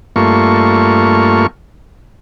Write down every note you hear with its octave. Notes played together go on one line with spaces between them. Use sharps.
G2 A3 A#3 F4 C#6